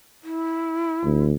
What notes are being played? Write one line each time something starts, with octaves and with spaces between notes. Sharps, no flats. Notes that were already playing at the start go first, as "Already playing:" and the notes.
E4
D2